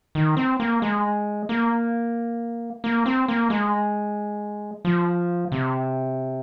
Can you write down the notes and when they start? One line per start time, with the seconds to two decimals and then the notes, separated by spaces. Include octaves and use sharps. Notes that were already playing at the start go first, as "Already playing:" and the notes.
0.15 D#3
0.37 C4
0.60 A#3
0.82 G#3
1.49 A#3
2.84 A#3
3.06 C4
3.28 A#3
3.50 G#3
4.85 F3
5.52 C3